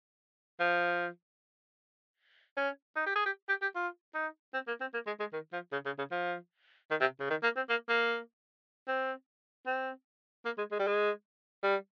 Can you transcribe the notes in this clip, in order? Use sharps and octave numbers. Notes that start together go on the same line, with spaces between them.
F3
C#4
D#4
G4
G#4
G4
G4
G4
F4
D#4
C4
A#3
C4
A#3
G#3
G#3
D#3
F3
C#3
C#3
C#3
F3
D#3
C3
C#3
D#3
A#3
C4
A#3
A#3
C4
C4
A#3
G#3
G#3
G3
G#3
G3